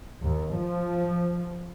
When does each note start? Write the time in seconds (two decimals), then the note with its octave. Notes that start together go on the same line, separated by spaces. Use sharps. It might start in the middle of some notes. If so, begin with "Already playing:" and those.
0.22 D#2
0.58 F3